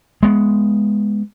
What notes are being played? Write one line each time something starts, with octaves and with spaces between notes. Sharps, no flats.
G#3 B3